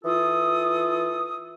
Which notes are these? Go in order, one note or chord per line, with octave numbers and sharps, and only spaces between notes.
E3 F4 A4 D#6